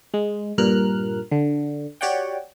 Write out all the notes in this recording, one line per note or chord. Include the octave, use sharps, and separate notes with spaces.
G#3
G2 A#2 A#4 F6 F#6
D3
F#4 G4 C#5 D5 F#5 G5